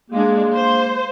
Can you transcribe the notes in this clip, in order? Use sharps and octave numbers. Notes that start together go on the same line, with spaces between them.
G#3 A#3 D4
C5